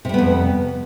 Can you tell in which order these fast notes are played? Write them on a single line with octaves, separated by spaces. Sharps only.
C3 G3 B3 F2